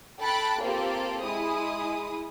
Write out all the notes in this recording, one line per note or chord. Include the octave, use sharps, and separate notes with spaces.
A4 G5 B5 F#6 A6
A#3 C4 F4 G4 A4
G#3 E4 D#6